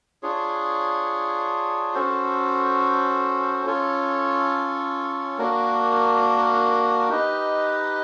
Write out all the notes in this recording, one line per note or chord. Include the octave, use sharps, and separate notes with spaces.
D4 F4 G#4 C#5
C#4 F#4 A4 C5
C#4 F4 A4 C#5
A#3 D4 F#4 A#4
D#4 G4 B4 D#5